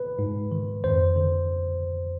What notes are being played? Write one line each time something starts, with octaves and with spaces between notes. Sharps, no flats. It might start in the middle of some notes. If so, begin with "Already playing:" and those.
Already playing: B4
G#2
D#3
F2 C5
D3